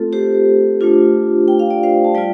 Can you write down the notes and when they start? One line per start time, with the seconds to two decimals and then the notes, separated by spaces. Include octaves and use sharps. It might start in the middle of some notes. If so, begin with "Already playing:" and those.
Already playing: A3 C4 F4 A4
0.13 G4 C5
0.81 A3 D4 F4
1.48 G5
1.59 F5
1.71 D5
1.83 C5 F5
2.04 A5
2.15 G3 F4 D5 G5